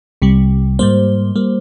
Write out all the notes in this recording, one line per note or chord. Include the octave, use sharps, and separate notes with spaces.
C2 C3 G3
G#2 G3 A#3 C5
G3 A#3